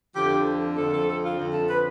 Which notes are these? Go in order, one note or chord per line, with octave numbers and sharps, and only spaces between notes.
F2 D3 F3 G4
F2 D3 F3 A4
A4
A4
F4
F2 D3 F3
A4
B4